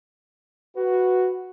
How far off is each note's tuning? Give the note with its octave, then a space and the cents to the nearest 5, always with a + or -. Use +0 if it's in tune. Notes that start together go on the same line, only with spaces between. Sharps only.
F#4 +0 B4 +0